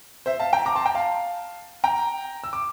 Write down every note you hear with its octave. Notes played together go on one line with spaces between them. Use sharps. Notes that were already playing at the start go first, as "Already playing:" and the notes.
C5 E5
F5 A5
G5 A#5
A#5 D6
A5 C6
G5 A#5
F5 A5
G5 A#5
E6
D6